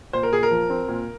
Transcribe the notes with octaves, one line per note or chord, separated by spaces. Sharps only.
A#2 C5
A#4
A#2 G#4
A#4
F3
C4
A#2